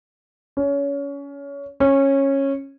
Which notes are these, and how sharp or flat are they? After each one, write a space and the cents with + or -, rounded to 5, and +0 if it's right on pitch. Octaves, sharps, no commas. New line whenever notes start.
C#4 +25
C#4 -15